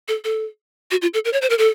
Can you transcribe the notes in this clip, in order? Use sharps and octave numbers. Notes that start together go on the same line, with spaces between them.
A4
A4
F#4
F4
A4
A#4
C#5
C5
A#4
A4